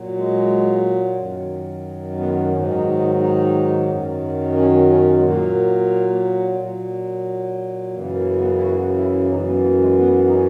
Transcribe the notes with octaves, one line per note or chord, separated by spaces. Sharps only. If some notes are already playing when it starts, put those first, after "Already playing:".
Already playing: A#2 F#3
G#3
F#2 D#3 F#3
B3
G#2 D#3 F#3 C#4
D#4
D#4
D#4
F#2 D#3 F#3
C#4
C#4
G#3
A#2 F#3 A#3
A#2 F#3
F#2 C#3 E3 A#3
A#3
B3
E4
F#4
E4
F#2 E3 D#4
B3
A#3
G#3
B3
D#4
C#4